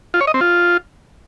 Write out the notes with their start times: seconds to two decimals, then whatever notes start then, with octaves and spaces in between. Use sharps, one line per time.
0.14 F4
0.21 C#5
0.27 D#5
0.34 C4
0.41 F4